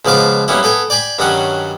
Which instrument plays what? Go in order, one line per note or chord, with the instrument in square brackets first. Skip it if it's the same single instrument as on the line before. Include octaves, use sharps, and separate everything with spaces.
[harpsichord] C#2 B2 F3 F5 D6
F#3 G3 A#3 B3 C#4 E4
B3 A4 G5 G#5
D5 G5 G#5 B5
G2 D#3 F#3 G3 C#4 F#4